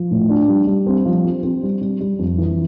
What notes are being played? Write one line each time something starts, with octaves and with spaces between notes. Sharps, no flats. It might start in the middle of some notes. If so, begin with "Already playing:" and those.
Already playing: F3
A2
D4
G3
G3
C4
F3
C4
C4
G3
G3
G3
F2
E3